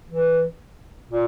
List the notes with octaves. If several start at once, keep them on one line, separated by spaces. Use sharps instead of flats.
E3
A#2